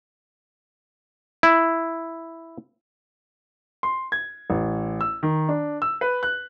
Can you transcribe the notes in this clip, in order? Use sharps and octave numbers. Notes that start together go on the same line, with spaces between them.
E4
C6
G#6
A1
E6
D#3
D4
E6
B4
F#6